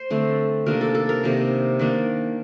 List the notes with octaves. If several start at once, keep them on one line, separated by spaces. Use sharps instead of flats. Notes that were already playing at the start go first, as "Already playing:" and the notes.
Already playing: C5
D3 A3 C4
C3 D#3 A#3 D4 A#4
A4
A4
A#4
C3 D#3 A#3 D4
D#3 A#3 D4